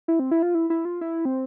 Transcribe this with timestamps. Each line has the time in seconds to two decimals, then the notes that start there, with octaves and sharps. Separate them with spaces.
0.08 E4
0.19 C4
0.31 E4
0.42 F4
0.55 E4
0.70 E4
0.85 F4
1.01 E4
1.25 C4